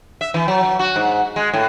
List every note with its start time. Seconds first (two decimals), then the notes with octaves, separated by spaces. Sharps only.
0.21 E5
0.34 E3
0.48 F#3
0.63 F#3
0.79 F#4
0.96 G#2
1.36 G#3
1.54 A2